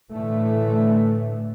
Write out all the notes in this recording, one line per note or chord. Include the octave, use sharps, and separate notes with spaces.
A2 D3 E3 A3